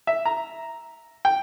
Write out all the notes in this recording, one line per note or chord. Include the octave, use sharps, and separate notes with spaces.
E5
A#5
G5